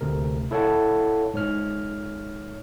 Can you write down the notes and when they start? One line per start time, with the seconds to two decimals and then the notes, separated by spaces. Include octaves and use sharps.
0.01 D2 C3 A#4
0.51 E4 A4 C#5 F5 F#5 A5
1.34 G#2 C#5 F6